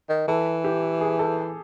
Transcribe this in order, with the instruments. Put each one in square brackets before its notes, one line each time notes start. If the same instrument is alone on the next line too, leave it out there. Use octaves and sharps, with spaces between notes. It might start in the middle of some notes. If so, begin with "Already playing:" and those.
[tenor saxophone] D#3
[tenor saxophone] E3 [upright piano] A4
[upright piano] G4
G#4
A4